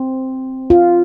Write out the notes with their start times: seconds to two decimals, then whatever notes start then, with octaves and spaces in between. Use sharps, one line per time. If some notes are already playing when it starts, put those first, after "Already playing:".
Already playing: C4
0.70 F4